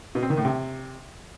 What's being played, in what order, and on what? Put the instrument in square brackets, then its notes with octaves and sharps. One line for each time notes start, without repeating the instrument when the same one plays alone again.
[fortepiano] B2
C4
D#3
A2
C3